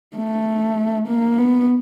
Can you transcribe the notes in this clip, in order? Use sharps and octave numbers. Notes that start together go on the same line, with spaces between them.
A3
A#3
B3